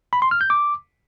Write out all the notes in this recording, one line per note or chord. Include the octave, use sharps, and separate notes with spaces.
B5
C6
F6
G6
D6